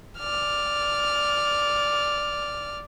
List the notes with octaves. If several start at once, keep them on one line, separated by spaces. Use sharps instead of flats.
D5 F6